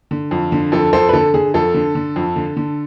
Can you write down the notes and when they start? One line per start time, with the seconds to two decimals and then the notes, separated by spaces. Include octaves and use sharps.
0.11 D3
0.31 F2
0.52 D3
0.72 F2 A4
0.93 F2 A4 C5
1.09 B4
1.13 D3 A4
1.34 D3 G#4
1.54 F2 A4
1.74 D3
1.95 D3
2.16 F2
2.36 D3
2.57 D3